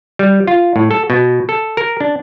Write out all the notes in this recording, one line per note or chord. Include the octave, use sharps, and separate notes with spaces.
G3
F4
A2
A4
B2
A4
A#4
D4